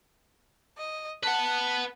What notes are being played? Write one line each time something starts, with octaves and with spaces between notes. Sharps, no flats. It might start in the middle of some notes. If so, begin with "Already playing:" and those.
D#5
B4 F#5 A5